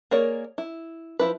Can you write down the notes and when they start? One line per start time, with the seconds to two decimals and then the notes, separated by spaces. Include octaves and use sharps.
0.11 A#3 G#4 A#4 C#5 D5
0.58 E4
1.19 F3 E4 B4